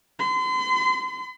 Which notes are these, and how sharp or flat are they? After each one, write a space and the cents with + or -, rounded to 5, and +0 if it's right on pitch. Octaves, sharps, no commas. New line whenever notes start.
C6 -40